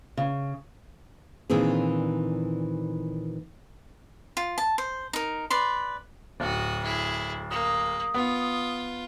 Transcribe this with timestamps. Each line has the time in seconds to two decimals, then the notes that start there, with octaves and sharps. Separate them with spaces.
0.17 C#3
1.50 A#2 D#3 E3 C4 D4 G#4
4.37 F4
4.58 A5
4.78 C5
5.13 D#4 A#4
5.50 B4 D5 C6
6.40 D1 F#4 D#6
6.83 E4 G#4
7.51 A#3 D#6
8.14 B3 F4